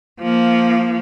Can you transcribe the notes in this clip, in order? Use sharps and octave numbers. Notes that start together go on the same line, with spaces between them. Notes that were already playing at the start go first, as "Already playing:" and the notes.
F3 A#3